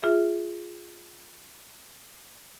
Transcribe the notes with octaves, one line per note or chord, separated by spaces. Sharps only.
F4 G#4 E5